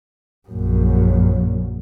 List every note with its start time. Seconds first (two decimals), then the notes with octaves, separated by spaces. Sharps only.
0.49 A#1 F#2